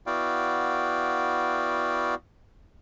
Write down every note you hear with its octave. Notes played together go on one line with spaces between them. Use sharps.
B3 E4 F#4 D5 F5 G5